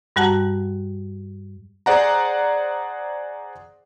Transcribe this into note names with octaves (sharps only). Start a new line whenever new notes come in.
G2 G3 F#4 F#5 A5 A#5
G#4 C5 D5 F#5 A#5